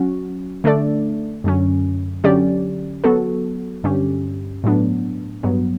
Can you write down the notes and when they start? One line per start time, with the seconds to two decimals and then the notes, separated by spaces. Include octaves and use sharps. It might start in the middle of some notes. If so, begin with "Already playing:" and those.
Already playing: F#3 C#4 F#4
0.64 D3 A3 D4 A4 D5
1.44 F#2 D3 F#3 C#4
2.24 D3 F#3 C#4 G4 D5
3.04 F#3 B3 F#4 A4
3.84 G2 D3 G3 C#4 G4
4.64 A2 F#3 B3 D4
5.43 G2 F#3 B3